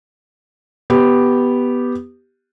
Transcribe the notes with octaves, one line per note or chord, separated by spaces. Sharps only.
B3 G4